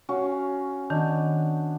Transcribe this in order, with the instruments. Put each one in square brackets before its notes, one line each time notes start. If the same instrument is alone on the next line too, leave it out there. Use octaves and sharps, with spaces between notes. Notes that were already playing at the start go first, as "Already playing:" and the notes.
[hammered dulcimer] C#4 F#4 F5
[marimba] D#3 [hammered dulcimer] B3 D4